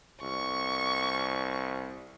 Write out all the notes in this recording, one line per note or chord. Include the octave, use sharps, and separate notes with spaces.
C2 C#6